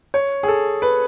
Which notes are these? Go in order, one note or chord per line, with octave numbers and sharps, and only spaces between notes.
C#5
G#4
A4
B4